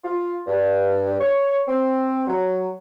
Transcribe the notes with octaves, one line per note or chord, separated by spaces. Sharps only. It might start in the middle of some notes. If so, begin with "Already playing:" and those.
F4
G2
C#5
C4
F#3